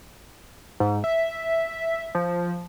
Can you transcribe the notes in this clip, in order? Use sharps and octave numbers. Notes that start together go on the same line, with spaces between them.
G#2
E5
F3